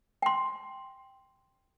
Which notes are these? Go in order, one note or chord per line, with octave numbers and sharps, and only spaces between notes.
G5 C6